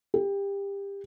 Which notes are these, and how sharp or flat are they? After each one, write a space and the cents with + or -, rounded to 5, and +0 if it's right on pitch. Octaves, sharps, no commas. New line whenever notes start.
G4 +25